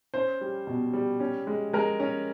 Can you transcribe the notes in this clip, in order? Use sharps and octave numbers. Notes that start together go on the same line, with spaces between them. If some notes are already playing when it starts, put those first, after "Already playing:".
C#4 C5
G3
B2
G3
C#4
G#3
G#3 A#4
C#4